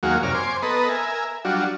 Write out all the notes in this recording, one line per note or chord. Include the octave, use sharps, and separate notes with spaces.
D#2 F#3 G#3 A#3 F#4 F5
F#2 C3 A#4 C#5 D5 F6
C5 G#5 C6 D6
B3 A4 B4 D#5 A#5
A#4 E5 G#5
F#3 G3 D4 F4 F#4